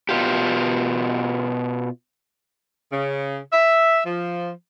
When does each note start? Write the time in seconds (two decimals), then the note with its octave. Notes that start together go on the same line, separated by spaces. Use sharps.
0.09 B2 F4 G4
2.92 C#3
3.52 E5
4.06 F3